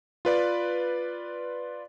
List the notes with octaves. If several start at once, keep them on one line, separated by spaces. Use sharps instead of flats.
F4 B4 D5